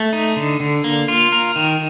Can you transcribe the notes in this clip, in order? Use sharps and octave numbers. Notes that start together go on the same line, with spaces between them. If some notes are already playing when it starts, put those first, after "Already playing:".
Already playing: A3
D#4
D3
D3
A#3
F4
A#4
D#3